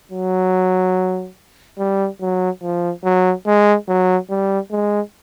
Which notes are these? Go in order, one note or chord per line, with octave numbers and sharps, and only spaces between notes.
F#3
G3
F#3
F3
F#3
G#3
F#3
G3
G#3